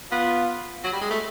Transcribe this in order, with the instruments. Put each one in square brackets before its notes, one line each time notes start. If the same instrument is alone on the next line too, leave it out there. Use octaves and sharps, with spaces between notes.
[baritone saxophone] B3 [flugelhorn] F4
[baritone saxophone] F#3
G3
G#3
A3